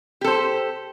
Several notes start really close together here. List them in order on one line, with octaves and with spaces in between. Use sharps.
G4 A4 C5